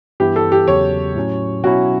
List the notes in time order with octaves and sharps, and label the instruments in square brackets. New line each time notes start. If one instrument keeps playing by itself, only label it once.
[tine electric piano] G2 E3 B3 E4 [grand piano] G4
[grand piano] A4
G4
[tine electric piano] E2 C#3 F#3 [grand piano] C#5
[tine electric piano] A2 F#3 C#4
[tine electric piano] B2 F#3 C#4 E4 [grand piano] F#4